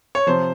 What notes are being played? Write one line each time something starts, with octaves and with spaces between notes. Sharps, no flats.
C#5
C3 F3 C5